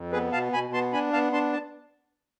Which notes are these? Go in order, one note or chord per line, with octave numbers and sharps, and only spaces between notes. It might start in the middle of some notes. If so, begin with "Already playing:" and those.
Already playing: F2
B3 G#4 B4
B2 F5 A5
B2 G#5 B5
B3 A5 C6
D4 G#5 B5
B3 F5 A5
D4 A5 C6
A5